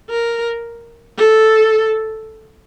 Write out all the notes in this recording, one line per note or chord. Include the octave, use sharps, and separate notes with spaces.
A#4
A4